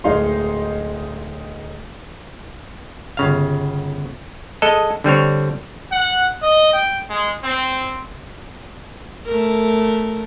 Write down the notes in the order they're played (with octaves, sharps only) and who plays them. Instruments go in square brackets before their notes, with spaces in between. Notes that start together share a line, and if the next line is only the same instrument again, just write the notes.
[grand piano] D1 G#3 D#4 F5 C6
[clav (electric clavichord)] G1 C#3 F5
G#3 A4 D#5
D3 G3 C4 C#5
[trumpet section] F#5
D#5
G5
G#3
C4
[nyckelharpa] A3 A#4